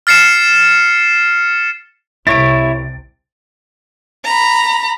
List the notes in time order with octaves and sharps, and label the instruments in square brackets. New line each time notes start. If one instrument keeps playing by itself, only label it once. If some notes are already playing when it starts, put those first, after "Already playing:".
[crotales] F6 A6 C7 C#7 E7
[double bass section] C2 C3 [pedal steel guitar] E4 C#5 [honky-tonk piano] A6 D7
[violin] A#5 B5